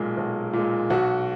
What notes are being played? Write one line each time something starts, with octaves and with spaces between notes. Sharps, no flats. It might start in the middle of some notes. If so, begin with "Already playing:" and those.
Already playing: B1 A#2 G#3 A#4
B1
A#2 G#3
B1 F#4